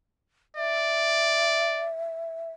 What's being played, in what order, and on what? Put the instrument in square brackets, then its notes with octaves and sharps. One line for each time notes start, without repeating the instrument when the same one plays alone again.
[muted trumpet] D5 [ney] E5